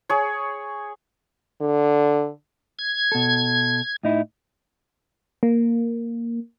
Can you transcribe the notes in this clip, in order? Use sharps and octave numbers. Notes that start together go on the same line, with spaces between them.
G#4 C#5
D3
G#6
B2 A4
A2 D#4 E4
A#3